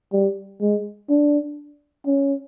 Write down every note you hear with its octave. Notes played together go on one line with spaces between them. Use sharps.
G3
G#3
D4
C#4